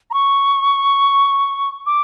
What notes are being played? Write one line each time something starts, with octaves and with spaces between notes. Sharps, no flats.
A#5
C#6
D6